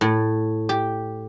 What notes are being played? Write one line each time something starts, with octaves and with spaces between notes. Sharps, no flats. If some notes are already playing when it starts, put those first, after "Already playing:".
A2
G4